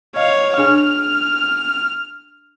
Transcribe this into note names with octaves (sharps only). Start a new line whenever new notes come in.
C#5 D#5 F5
D4 G#4 G#5 F6